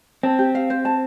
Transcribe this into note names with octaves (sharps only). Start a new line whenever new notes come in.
C4 A5
G4
F5
C5
A5